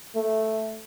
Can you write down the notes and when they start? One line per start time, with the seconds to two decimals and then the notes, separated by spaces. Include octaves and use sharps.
0.15 A3